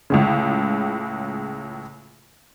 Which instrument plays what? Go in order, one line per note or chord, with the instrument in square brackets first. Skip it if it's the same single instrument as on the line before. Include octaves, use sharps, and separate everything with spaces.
[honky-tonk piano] C#2 A2 C#3